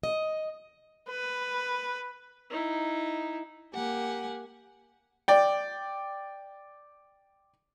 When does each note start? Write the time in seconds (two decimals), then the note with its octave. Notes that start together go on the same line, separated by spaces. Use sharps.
0.03 D#5
1.10 B4
2.50 D#4 E4
3.74 A#3 G4 F#5 G#5
5.28 D5 G5